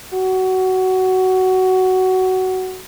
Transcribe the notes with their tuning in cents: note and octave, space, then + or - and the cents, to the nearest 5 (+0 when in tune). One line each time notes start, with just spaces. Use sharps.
F#4 +15